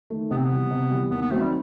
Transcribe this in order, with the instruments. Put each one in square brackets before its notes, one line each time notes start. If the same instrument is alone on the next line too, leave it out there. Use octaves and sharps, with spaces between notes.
[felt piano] D#3 A3
[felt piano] C3 [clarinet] B3
[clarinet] C4
B3
[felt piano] E3 G3
C3
E3 G3
[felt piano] D#2 [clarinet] B3
[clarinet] B3
[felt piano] D#3 F#3 C4 [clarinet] A3
[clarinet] G3